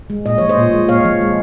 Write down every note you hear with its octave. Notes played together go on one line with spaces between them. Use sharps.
G#3
A#2 D#5
F3 C#5
C5 D#5
A#2
G#3
A#2 C#5 F5
F3
G#3